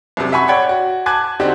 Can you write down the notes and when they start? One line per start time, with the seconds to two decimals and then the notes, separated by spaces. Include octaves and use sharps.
0.17 C2 F#2 C3
0.32 E5 F#5 G#5 B5 C#6
0.48 C#5 D5 F#5 G5 B5 G#6
0.69 F#4
1.06 G#5 A5 D6 F#6 G#6
1.40 D3 C4 D4 D#4 F#4 G4